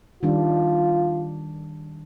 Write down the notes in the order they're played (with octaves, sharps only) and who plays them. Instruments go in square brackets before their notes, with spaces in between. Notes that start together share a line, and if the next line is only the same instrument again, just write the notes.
[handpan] D#3 G3 D4 [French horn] F4